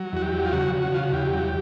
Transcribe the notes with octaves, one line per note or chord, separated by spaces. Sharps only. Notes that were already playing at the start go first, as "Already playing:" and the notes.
Already playing: F#3
E2 F#4
G4
F#3
F4
C#3 F#4
C#3
C#3 F4
F#4
E2 G4
F#3